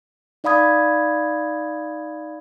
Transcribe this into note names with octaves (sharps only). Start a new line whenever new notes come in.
D#4 D5 F5 B5 D#6 G#6